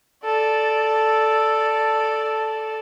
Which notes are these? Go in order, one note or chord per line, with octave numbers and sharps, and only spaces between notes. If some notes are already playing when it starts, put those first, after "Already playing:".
A4 D5